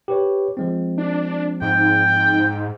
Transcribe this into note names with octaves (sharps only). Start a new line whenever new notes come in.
G4 B4 C#5
F3 G#3 C4
D4
G#2 G5